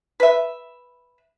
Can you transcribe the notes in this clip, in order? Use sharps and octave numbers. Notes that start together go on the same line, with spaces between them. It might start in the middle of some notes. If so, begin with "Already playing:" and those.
B4 E5